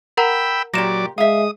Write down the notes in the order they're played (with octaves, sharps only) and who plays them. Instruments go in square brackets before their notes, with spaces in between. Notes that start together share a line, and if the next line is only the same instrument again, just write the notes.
[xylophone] A#4 F#5 A#5 [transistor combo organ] G5 B5 E6
[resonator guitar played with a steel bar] A#2 G4 [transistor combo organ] F#3 D5 [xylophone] A#6 E7
[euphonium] G#3 [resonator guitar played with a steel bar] E5 F5 [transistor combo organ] D#6